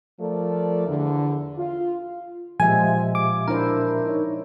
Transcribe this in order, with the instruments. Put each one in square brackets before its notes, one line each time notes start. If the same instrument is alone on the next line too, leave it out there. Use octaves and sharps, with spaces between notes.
[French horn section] F3 A3 A4 A#4 D5
E2 D3
F4
[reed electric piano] A#2 G4 E5 [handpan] F3 G#3 [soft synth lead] G#5
[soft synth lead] D6
[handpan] D4 E4 C5 [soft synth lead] A#4
[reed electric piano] D#4 C#5